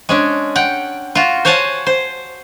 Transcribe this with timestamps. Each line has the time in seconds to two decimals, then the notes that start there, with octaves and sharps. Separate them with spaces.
0.09 G#3 C#4 D4
0.55 F#5 G5
1.15 F4 F#4
1.45 C5 C#5 F#5 G#5 A5
1.86 C5